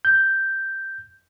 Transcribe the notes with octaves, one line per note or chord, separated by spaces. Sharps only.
G6